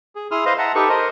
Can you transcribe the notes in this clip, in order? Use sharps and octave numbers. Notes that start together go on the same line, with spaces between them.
G#4
E4 G#4 C6 D#6 F6
B4 C5 D#5 F5 C6
E5 F#5 A5 A#5
D#4 G4 A4 B4 C#6
A#4 C5 D#5